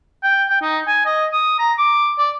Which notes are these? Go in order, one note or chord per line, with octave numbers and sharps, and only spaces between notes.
G5
G5
D#4
G#5
D#5
D#6
A#5
D6
D5